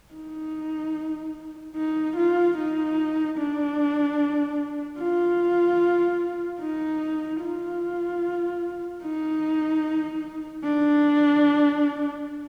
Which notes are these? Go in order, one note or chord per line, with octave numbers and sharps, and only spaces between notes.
D#4
D#4
F4
D#4
D4
F4
D#4
F4
D#4
D4